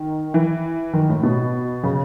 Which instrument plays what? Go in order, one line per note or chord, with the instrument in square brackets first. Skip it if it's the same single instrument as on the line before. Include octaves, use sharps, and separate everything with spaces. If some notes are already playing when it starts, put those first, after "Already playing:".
Already playing: [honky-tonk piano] D#3
E3
D#3
A2
B2
C#3